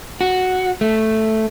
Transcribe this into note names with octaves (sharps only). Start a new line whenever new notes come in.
F#4
A3